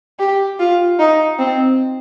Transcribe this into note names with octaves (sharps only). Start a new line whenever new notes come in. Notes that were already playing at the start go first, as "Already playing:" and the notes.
G4
F4
D#4
C4